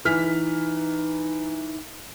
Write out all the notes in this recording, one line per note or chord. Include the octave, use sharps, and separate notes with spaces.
E3 D#4 F6 B6